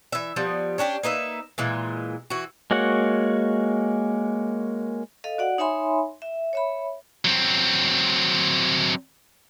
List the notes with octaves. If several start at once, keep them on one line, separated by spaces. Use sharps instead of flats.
E3 E5
F3 G3 B3
C#4 D4 F#4 G4
A#3 D#4 B4 E5
A#2 E3 G#3
E3 F#4
G#3 A#3 F#4 C#5 F#5
A4 D#5 F5
F#4 D5 F#5
D#4 C#5 E5 G#5 B5 C6
E5
C#5 E5 B5
F#3 C4